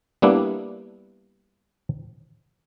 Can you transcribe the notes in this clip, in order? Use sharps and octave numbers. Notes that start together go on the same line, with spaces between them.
G3 A#3 B3 D4 E4